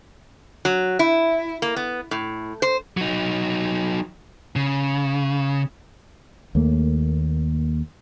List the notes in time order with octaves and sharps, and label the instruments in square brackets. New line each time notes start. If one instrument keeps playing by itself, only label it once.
[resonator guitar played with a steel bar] F#3
E4
A#3
B3
A2
C5
[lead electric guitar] F#3 D#4
C#3
[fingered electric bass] D#2 A3 A#3